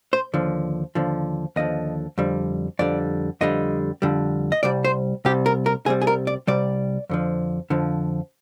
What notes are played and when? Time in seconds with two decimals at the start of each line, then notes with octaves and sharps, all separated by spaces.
0.13 C5
0.34 D#2 D3 F3
0.95 D#2 D3 F3
1.56 D#2 D3 F3 D#5
2.18 F2 D3 G3
2.79 F2 D3 G3 D5
3.41 F2 D3 G3 D#5
4.02 F2 D3 G3
4.52 D#5
4.63 C2 C3 G3 D5
4.85 C5
5.25 C2 C3 G3 G4
5.46 A#4
5.66 A#4
5.86 C2 C3 G3 G#4
6.02 G#4
6.07 A#4
6.27 D5
6.47 C2 C3 G3 D5
7.10 F2 D3 F3
7.70 F2 D3 F3